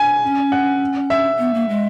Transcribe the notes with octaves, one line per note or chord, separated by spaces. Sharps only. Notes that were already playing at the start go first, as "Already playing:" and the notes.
Already playing: G#5
C#4
F#5
E5
B3
A#3
G#3